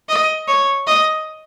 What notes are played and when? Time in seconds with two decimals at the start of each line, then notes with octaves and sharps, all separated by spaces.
0.09 D#5
0.48 C#5
0.87 D#5